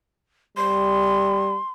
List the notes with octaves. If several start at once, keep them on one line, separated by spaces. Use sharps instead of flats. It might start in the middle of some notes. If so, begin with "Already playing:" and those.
G3 C6